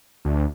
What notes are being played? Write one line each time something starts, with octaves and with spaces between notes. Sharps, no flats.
D2